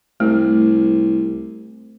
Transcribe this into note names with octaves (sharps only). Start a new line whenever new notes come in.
C2 A3